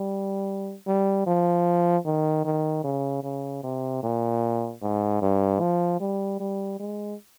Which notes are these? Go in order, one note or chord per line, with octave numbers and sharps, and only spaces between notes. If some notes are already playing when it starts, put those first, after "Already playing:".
Already playing: G3
G3
F3
D#3
D#3
C#3
C#3
C3
A#2
G#2
G2
F3
G3
G3
G#3